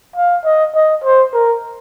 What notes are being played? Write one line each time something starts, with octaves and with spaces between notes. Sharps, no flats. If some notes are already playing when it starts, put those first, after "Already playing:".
F5
D#5
D#5
C5
A#4